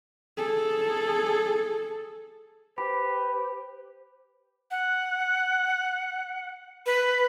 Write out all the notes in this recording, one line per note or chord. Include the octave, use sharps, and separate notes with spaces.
G#4 A4
G4 B4 C5 B5
F#5
B4